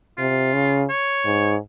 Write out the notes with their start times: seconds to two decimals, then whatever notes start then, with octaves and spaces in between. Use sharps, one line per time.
0.18 C3 F4
0.54 C#3
0.90 C#5
1.25 G#2